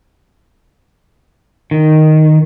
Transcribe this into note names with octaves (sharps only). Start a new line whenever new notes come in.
D#3